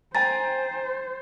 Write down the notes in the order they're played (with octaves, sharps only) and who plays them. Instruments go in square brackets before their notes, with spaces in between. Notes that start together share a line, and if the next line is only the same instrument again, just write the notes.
[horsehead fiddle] C5 [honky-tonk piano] G5 G#5 A#5 [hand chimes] A6